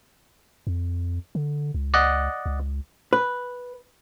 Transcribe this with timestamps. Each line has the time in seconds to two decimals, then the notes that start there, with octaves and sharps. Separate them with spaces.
0.67 F2
1.35 D3
1.74 C#2
1.94 D5 D#5 F#5
2.46 C#2
3.13 B4